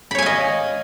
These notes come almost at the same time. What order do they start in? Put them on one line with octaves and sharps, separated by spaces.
B5 C#5 G#5 F5 D#5